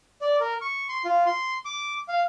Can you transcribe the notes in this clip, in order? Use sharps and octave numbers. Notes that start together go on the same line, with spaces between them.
D5
A#4
C#6
C6
F4
C6
D6
F5